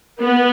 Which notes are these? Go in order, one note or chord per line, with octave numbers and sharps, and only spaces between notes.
B3